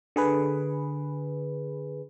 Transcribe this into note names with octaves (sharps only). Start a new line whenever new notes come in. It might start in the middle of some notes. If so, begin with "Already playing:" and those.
D3 G#4 B4